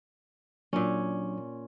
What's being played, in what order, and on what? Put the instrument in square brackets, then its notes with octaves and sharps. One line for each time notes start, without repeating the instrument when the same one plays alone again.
[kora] A#2 C#4 [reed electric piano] F#3 A#3 D4